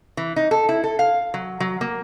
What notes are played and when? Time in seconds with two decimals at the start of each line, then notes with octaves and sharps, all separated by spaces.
0.17 E3
0.36 D#4
0.51 A4
0.69 E4
0.84 A4
0.99 F5
1.34 F#3
1.60 F#3
1.81 A#3